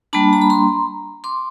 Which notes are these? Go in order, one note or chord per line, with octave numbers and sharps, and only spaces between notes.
G3 A#3 D4 A5 B5
A#5
B5
A#5 C6
C6 D6